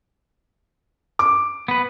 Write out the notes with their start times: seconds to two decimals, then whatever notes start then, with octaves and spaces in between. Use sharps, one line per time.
1.19 D6
1.68 B3 B4